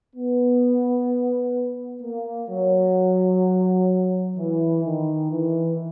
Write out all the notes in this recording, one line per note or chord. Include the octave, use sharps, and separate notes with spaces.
B3
A#3
F#3
E3
D#3
E3